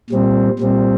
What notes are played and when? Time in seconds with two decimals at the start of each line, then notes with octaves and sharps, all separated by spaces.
0.10 A#2 G3 C4
0.59 A#2 G3 C4